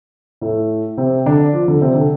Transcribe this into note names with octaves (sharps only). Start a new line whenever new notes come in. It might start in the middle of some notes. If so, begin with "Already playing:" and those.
A2 A3
C3 C4
D3 D4
F3 F4
D3 D4
C3 C4
D3 D4